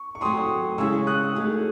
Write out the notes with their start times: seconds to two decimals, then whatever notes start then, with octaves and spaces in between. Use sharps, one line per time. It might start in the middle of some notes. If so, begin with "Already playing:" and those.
Already playing: C#6
0.15 C#6
0.21 F#3 A3 C4 C6 D#6
0.78 C#3 G#3 C#4 E4 G#4 C#6 E6
1.07 D#6 F#6
1.35 F#3 A3 D#4 G#4